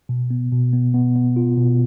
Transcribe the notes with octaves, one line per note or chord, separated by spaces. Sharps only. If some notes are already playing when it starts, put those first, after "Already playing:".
B2
B3
B2
B3
B3
B3
F4
B2